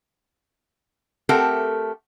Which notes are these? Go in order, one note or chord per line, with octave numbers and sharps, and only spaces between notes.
A3 C4 G4 A4 A#4 F#5